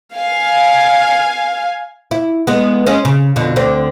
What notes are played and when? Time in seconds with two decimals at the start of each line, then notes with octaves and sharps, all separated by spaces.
0.16 F5 G#5
2.11 E4
2.47 G#3 B3
2.86 G#3 C#4
3.05 C#3
3.36 F2 B2 D3
3.56 D2 D3 C4